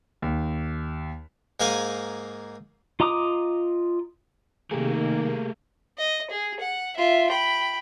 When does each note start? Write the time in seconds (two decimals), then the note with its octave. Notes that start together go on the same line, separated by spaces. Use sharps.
0.22 D#2
1.60 G#2 A#3 G#4 F5 G#5
3.00 F4 D#5 A#5 D6 D#6
4.71 C3 D#3 A3 A#3 G4 G#4 A#4
5.98 D#5
6.30 G#4
6.60 F#5
6.97 F4 E5
7.30 G5 B5